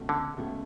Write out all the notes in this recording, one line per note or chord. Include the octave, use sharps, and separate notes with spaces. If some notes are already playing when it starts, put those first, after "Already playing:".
Already playing: C#2 B2 A3
D3
C#2 B2 A3